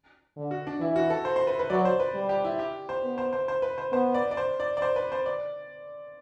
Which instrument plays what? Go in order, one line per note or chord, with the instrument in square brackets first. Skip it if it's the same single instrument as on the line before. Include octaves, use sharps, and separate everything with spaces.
[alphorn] D3
[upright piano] F#4
D4
[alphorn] E3 [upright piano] E4
[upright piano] F#4
A4
C5
C5
B4
B4
[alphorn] F#3 [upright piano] D5
[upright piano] C5
B4
[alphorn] G3
[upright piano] G4
E4
G4
C5
[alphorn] B3
[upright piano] C5
C5
C5
B4
C5
[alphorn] B3 [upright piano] C5
[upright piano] D5
D5
C5
D5
D5
C5
B4
C5
D5